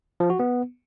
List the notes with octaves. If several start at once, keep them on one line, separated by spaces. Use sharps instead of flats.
F3
F#4
B3